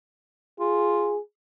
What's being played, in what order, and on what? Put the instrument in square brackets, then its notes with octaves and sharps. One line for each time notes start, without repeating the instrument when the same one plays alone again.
[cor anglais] F4 [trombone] G#4